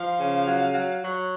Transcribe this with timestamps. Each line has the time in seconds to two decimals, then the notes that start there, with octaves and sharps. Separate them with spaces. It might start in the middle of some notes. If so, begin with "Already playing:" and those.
Already playing: F3 F5
0.17 C#3
0.45 F#3
0.73 F#3
1.02 F#3